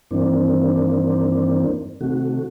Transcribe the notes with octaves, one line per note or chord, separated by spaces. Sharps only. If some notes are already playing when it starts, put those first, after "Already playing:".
G2 D#3 E3 A#3 C4 D4
C3 D#3 A3 F#4